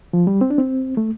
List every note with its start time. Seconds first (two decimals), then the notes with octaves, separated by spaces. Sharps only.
0.13 F3
0.27 G3
0.41 C4
0.50 D4
0.58 C4
0.97 A3